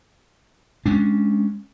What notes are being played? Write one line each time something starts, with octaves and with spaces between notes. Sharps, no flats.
G#3 C#4 D4